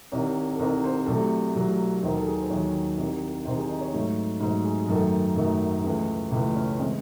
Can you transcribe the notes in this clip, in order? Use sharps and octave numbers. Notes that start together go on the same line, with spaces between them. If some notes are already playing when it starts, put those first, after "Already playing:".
C2 C3 D#3 C#5
A4
C2 C3 D#3 C5
C5
C2 C3 F#3 A3 A4
C2 C3 F#3 A3
D#2 D#3 F#3 C5
A4
G#4
C5
D#2 D#3 F#3 C#5
C2 C3 D#3
C2 C3 D#3 C5
G#4
D#4
C#5
G#2 F#3 A3
G#2 F#3 A3 C5
G#4
F#2 D#3 F#3 A3 A4
F#2 D#3 F#3 A3
C#2 C#3 E3 A3 G#4
C#2 C#3 E3 A3 E4
C#4
C#3 E3 G#3 C4